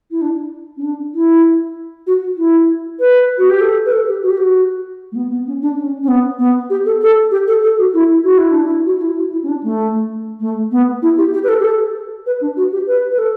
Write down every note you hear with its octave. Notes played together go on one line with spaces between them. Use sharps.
E4
D4
C#4
D4
E4
F#4
E4
B4
F#4
G4
A4
B4
A4
G4
F#4
G4
F#4
A3
B3
B3
C#4
D4
C#4
C#4
B3
B3
G4
A4
A4
G4
A4
A4
F#4
E4
F#4
E4
D4
E4
F#4
F#4
E4
F#4
E4
C#4
D4
A3
A3
B3
E4
G4
G4
B4
A4
G4
A4
B4
D4
F#4
G4
B4
B4
A4